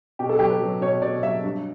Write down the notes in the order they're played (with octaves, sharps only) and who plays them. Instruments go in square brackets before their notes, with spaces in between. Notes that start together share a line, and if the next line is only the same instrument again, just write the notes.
[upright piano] B2 G4
A4
F#3 G4
B4
F#3
B2 C#5
B2 D5
F#3 E5
G2